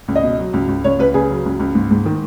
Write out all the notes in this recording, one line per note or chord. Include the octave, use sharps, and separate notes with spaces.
C#2
D#5
B2
F#3
C#2
C#2
C#2 C#5
C#2 B4
C#3 G#4
F#3
C#2
C#2
G#2
G#2
D#3